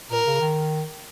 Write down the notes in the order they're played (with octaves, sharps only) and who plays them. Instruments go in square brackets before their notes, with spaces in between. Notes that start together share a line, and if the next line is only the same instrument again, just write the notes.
[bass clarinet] A#2 [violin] A#4
[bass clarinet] C#3
D#3